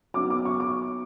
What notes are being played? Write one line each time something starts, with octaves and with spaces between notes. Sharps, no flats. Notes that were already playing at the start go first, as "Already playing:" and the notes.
F#3 B3 D#4 D6
D6
C#6
D6